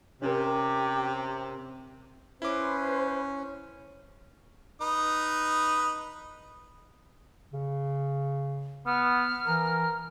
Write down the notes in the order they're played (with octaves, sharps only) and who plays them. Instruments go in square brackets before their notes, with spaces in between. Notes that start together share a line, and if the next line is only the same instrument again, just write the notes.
[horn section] C3 [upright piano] C#4 A#4 [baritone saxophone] G4
[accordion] C#4 [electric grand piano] E4 D6 [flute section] B4 C5
[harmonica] D#4 B4 D#6
[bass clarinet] C#3
[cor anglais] B3 [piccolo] F6
[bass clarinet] E3 [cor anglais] A#4